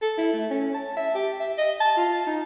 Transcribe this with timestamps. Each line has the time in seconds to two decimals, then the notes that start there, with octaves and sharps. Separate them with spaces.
0.02 A4
0.17 E4
0.33 A3
0.50 C#4
0.74 A5
0.97 E5
1.14 G4
1.40 E5
1.58 D#5
1.80 A5
1.97 F4
2.27 D#4